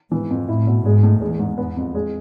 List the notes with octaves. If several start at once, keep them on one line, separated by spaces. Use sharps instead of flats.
G#2 E3
F2
A2 E4
B2
G#2 G#3
A2
E2 G#3
G#2
E2 B3
F2
G#3